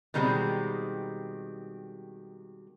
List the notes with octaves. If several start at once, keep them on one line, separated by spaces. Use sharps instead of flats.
B2 D#3 G3 G#3 B3 C4